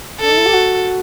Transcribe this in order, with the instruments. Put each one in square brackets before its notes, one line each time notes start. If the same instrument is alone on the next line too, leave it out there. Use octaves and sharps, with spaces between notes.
[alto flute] D4 [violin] A4
[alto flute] D#4
E4
G4
F#4